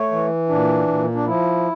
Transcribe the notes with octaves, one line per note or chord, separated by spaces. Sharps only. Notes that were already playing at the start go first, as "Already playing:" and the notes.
Already playing: A3 C#5
E3
A#2 D4
A#2
D4
F3 E4